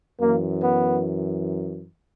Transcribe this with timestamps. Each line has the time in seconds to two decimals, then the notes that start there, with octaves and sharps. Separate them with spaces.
0.21 F#2 E3 A#3
0.63 B3